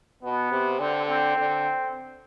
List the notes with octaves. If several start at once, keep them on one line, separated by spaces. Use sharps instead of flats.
B2 B3
C3
D3 C4
C4
D3